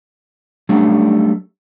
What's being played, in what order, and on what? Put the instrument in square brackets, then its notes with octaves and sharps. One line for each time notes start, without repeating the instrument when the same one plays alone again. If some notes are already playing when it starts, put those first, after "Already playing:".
[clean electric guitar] F#3 G3 A3 C#4 D4